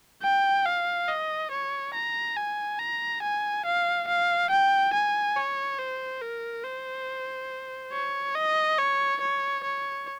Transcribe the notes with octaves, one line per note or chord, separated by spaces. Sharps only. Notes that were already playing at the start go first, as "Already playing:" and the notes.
G5
F5
D#5
C#5
A#5
G#5
A#5
G#5
F5
F5
G5
G#5
C#5
C5
A#4
C5
C#5
D#5
C#5
C#5
C#5